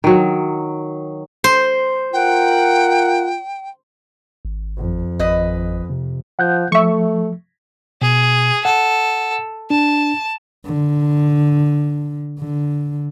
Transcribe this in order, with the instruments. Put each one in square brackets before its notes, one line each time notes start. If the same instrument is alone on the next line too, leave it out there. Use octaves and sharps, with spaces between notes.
[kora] D#3 F#3
[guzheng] C5
[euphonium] F4 [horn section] A#4 F#5 [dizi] G5
[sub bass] G#1
[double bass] F2
[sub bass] G#1 [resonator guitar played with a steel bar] B4 D#5
[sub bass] C3
[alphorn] F3 [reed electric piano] F#5 F#6 G6
[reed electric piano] F3 [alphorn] A3 [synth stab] E5 C#6
[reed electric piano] B2 [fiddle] G#4
[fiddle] A4 [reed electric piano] F#5
[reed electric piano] D4 [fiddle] A5
[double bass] D3
D3